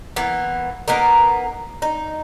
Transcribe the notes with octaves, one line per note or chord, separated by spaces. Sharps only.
E3 A#3 B3
A#3 B3 D#4 A#4
D#4